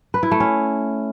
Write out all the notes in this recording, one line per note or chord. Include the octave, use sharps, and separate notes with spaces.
B4
E4
A3
C#4